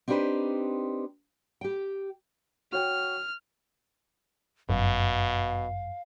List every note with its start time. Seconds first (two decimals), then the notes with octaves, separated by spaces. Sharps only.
0.08 C4 D4 D#4 G4 B4 C5
1.61 G4 G5
2.72 F#4 C#5 G5 F6
4.69 G1 F#2 B2 F5